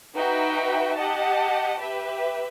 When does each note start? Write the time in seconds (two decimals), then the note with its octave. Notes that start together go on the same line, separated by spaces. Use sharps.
0.14 D#4 F#4 B4 E5 G5
0.96 G4 D#5 F#5 A5
1.78 G4 B4 E5